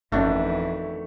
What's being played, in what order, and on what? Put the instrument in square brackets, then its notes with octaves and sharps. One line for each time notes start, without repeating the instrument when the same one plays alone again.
[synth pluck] G1 C#4 [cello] F2 E3 [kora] D#3 D4 F#4 [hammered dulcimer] A3